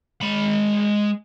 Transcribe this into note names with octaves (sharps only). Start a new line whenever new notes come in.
G#3 B5